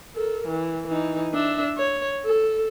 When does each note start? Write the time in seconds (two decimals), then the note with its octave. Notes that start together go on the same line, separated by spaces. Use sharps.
0.15 A4 A#4
0.47 E3
0.87 E3 D#4
1.34 D4 E5
1.77 C#5
2.25 A4